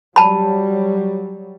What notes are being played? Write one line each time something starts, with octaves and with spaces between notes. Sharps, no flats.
F#3 G3 A5 B5